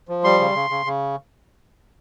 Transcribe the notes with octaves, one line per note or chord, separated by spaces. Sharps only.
F3
G3 C6
C#3
C#3
C#3
C#3